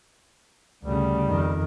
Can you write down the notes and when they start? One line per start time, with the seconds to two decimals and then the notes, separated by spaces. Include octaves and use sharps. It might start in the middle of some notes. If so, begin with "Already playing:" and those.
0.83 D2 C#3 G3
1.24 F2 D#3